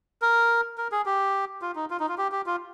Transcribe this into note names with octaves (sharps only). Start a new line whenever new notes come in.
A#4
A#4
G#4
G4
F4
D#4
F4
D#4
F4
G4
G4
F4